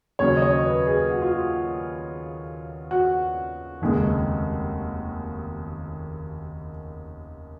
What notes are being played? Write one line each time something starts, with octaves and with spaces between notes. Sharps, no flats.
D#2 C#3 F#3 C#5
D#5
C#5
B4
G#4
F#4
F4
F#4
F#4
F1 D#2 C#3 G#3